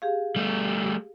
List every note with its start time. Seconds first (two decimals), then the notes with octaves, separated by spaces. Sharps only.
0.02 G4 G#4 F5
0.36 G3 A3